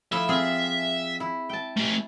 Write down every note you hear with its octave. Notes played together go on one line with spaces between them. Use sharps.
F3 A3 E4 E5
C4 F4 G#4
E4
G5 A5
A3 G4